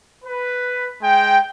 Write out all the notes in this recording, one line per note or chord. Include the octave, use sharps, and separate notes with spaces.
B4
G#3 G5